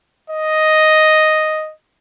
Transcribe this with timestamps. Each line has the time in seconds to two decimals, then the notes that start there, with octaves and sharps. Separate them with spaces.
0.30 D#5